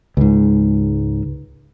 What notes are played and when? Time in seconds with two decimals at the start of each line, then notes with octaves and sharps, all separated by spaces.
0.17 C#2 G#2